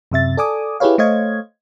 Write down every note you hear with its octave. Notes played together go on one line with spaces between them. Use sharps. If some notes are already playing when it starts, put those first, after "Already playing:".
F#2 C3 E5 A6
A4 D5 G#5 D6 D#6
E4 G4 G#4 B4 C#5 F5
A3 C5 C#5 D#5 F5 G#6